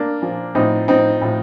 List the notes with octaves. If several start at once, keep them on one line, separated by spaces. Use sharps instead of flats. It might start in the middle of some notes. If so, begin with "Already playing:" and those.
Already playing: A#3 D4
A#2 F3
A2 F3 C4 D#4
A2 F3 C4 D#4
A2 F3